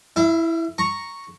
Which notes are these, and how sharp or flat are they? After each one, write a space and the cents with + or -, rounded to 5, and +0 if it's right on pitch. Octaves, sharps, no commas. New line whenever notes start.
E4 +0 F5 -45
A#5 +0 C#6 +0